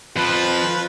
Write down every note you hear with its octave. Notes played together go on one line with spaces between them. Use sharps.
F2 F3 F4 B4